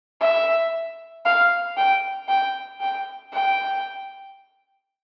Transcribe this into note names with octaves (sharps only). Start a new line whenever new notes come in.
E5
F5
G5
G5
G5
G5